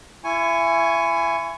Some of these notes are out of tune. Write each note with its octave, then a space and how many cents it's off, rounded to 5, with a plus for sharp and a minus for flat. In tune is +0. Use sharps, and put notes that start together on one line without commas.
E4 +30 G#5 +0 C#6 +0